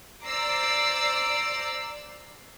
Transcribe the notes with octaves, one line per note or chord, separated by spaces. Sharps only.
C5 D5 A#5 D6 E6 C7